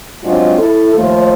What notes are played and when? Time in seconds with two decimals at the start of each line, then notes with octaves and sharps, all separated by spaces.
0.24 G#2 F#3 G#3 C4 D4 F4
0.58 E4 A4
0.95 D#2 F3 A3